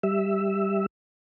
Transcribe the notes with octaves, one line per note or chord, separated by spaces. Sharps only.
G3 E5